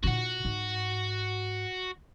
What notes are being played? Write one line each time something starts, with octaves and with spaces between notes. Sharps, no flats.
A#2 D#4 F#4 F#5
G#2